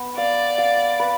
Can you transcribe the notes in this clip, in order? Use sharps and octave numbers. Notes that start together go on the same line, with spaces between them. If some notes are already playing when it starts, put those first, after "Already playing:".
Already playing: B3
D5 F5
F5
B4